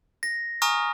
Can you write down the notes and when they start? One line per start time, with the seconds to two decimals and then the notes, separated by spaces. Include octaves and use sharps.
0.23 A#6
0.62 G#5 A#5 C#6 D#6 F6